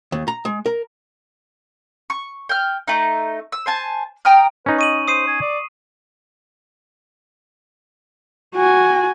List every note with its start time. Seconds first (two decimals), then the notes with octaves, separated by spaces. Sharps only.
0.12 D#2
0.28 A#5
0.45 G#3
0.66 A#4
2.10 C#6
2.49 G5 F6
2.87 A3 D#4
3.52 E6
3.66 C5 G#5 A5
4.25 G5 A#5 D#6 F6
4.66 C#4 D#4 B4
4.79 D#5 C#6 D#7 F#7
5.08 C5 D#6 C7 D#7
5.27 G#5
5.42 D5
8.56 F#4 G#5